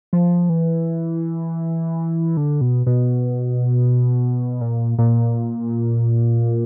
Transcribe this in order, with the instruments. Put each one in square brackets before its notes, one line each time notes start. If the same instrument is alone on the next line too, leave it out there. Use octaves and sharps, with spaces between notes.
[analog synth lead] F3
E3
D3
B2
B2
A#2
A#2